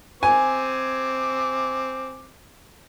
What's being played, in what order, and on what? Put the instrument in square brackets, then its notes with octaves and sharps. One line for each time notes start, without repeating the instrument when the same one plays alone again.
[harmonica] C4 D6 [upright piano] G#5